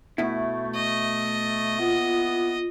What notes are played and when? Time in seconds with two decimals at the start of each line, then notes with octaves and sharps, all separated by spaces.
0.18 B2 A3 E4
0.76 D#5
1.79 E3 A#3 B3 F4